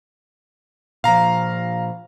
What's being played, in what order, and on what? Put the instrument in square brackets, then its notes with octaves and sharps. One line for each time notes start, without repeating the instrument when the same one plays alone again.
[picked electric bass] A#2 F3 [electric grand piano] F5 A#5